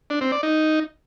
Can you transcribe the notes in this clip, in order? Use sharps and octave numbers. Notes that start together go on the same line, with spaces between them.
D4
C4
D5
D#4